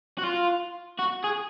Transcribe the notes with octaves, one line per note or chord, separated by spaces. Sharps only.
F#4
F4
F#4
G#4